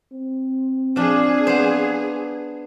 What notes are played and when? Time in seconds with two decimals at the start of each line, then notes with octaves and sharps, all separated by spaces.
0.13 C4
0.96 F3 D4 G#4
1.47 B3 C5